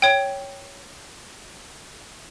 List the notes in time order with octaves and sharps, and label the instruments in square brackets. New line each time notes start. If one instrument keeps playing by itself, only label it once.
[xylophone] C#5 G5